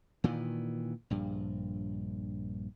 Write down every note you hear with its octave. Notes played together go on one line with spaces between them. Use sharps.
A#2 D#3 E3
A#1 G2